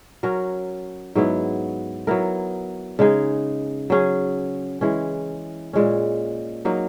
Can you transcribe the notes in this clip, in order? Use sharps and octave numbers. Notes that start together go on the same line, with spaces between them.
F#3 C#4 F#4 A#4
G#2 F#3 B3 E4
F#3 B3 E4 A#4
C#3 G#3 D#4 G#4
F#3 C#4 G#4
E3 G#3 C#4
A#2 G#3 C#4
F#3 A#3 D#4